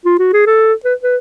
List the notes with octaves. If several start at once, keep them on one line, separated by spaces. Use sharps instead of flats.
F4
F#4
G#4
A4
B4
B4